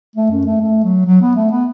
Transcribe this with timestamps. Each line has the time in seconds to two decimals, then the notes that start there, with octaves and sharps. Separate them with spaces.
0.15 A3
0.31 F#2
0.45 A3
0.62 A3
0.84 F#3
1.05 F#3
1.21 B3
1.36 A3
1.51 B3